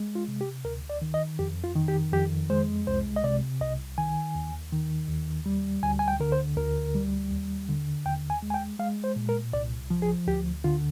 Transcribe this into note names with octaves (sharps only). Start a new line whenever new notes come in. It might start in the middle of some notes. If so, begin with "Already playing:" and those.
Already playing: G#3
F4
C3
G4
D2 A#4
D5
D#3
D#5
F2 G4
F4
D#3
G4
F2 G4
G#3 C5
C2 C5
D#5
C3 D5
C2 D#5
D#3 G#5
D#2
D#3
D#2
G3
D2 G#5
G#5
G5
D3 A#4
C5
D2 A#4
G3
D#2
D3
D#2 G5
G#5
G#3
G#5
G5
G#3 F5
C5
A#2
A#4
C2 D5
F3
G#4
D2 G4
D3 F4